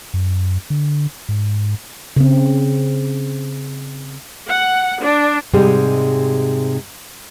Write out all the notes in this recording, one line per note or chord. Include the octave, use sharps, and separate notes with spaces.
F#2
D3
G#2
C#3 C4
F#5
D4
G#2 C3 G3 G#3